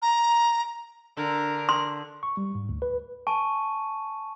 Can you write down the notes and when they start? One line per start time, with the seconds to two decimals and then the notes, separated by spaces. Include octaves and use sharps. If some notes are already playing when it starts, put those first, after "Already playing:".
0.02 A#5
1.17 D3 A#4
1.69 C6
2.23 C#6
2.37 G3
2.55 G#2
2.69 D2
2.82 B4
3.27 G#5 A5 C#6 D#7